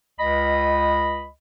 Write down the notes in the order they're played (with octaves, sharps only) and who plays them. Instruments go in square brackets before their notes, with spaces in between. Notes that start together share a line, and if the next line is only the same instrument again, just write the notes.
[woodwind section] C#2 D#5 B5